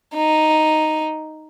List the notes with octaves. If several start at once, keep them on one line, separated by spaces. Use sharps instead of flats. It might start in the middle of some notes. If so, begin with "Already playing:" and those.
D#4